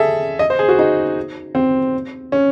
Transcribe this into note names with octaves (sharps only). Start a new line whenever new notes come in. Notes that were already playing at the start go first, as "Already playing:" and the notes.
Already playing: G#4 A4 E5
D#5
C5
G#4
F#4
D#4
C4
C#4